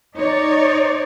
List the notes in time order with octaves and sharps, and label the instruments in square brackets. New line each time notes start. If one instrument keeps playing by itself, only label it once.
[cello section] D#4 C#5 D5